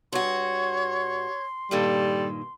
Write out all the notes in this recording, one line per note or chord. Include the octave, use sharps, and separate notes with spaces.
G2 F#4 C#5 C6
G2 A#2 D#3 G3 A4